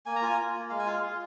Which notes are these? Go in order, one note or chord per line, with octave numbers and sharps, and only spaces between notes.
A#3 G#5
A#5
F4 G#5
F4
A#3
G#3 F5
G#5
F4 F5
F4